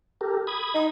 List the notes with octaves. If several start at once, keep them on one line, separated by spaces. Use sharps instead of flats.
G4 A4 A#4
B5 D#6 G#6
D#4